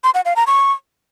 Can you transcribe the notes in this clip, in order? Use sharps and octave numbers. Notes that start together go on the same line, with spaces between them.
C6
F#5
F5
A#5
C#6